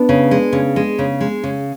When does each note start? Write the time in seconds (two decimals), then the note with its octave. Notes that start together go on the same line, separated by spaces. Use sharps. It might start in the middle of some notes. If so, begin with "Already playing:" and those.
Already playing: B3 D4
0.09 C#3
0.31 G#3
0.53 C#3
0.76 G#3
0.99 C#3
1.20 G#3
1.44 C#3